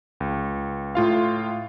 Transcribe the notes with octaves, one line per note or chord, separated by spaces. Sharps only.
C#2
A2 F4 F5